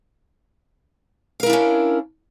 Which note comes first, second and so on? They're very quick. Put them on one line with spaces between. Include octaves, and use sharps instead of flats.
F5 A#4 E4 D4 C#4